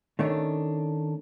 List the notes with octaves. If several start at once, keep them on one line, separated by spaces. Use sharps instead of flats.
D#3 A3 C#4 D4